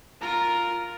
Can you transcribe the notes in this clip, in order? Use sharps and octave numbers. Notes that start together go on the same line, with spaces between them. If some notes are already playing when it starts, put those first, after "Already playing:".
F4 A#4 A#5